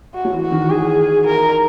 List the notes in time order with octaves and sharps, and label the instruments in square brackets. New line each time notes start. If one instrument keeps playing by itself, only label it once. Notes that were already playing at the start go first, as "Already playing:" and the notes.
[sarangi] F#4
[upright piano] F#3
E3
[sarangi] F#4
[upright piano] D#3
[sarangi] G#4
A#4